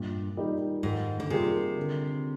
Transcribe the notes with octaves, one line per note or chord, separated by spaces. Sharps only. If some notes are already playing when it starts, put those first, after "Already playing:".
Already playing: G2 A#2
G3 A#3 D#4 G4
G#2 D#3
D3
C3 G3 A#3 F4 G#4
D3